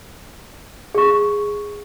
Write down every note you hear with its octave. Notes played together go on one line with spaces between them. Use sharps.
G#4 C#6